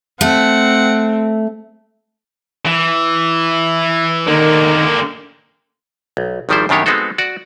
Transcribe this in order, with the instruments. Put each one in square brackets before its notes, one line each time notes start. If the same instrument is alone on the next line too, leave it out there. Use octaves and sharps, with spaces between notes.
[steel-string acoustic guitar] A3 [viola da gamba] C4 [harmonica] F#5
[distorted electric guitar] E3
[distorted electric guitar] D3 A#3 [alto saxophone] D#3
[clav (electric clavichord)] B1
G#1 D#3 F3 G3 E4 C5
F#2 B2 D#3 D4 G4 C#5
G#3 B3 C4 D#4 F#4 A4
F#4 D5